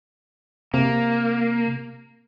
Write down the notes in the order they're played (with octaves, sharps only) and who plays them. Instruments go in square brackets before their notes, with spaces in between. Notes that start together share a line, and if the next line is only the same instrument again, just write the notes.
[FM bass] C3 [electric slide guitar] A#3